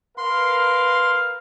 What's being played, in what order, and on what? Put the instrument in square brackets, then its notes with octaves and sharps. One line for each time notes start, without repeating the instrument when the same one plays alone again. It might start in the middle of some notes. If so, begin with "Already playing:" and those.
[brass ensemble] A#4 B4 F5 [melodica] C6